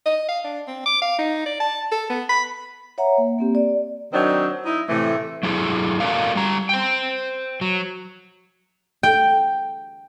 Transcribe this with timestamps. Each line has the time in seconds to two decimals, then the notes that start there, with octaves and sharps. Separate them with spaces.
0.06 D#5
0.28 F5
0.44 D4
0.67 C4
0.86 D6
1.02 F5
1.19 D#4
1.46 D5
1.60 A5
1.92 A4
2.10 B3
2.29 B5
2.98 C#5 E5 F#5 A#5
3.18 A#3
3.39 A#3 C4 G4
3.55 D5
4.12 D#3 F#3 C4 D4 D#4
4.65 D#4 E4
4.88 A2 C3 E3 A3
5.43 F#3 E4 G#4 A4
6.00 C#4 F#4 A4 A#4 D5 F5
6.35 G3 A#5
6.69 C5 G5
7.61 F#3
9.03 G5